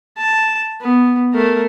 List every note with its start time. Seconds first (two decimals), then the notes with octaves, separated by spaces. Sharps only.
0.18 A5
0.81 B3
1.33 A3 A#4